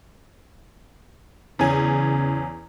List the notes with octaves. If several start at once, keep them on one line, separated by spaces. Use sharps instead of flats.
E2 C#3 C#4 G#5